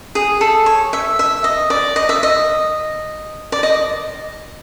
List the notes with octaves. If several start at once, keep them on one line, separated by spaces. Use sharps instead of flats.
G#4
A4
C#5
E5
E5
D#5
D5
D#5
E5
D#5
D5
D#5